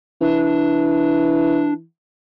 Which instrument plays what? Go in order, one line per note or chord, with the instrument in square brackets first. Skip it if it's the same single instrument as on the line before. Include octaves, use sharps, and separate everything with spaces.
[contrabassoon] E3 [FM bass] D4